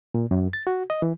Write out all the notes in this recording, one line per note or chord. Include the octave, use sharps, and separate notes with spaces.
A#2
F#2
A6
F#4
D#5
E3